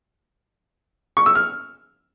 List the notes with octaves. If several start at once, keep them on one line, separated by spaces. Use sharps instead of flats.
C#6
E6
F6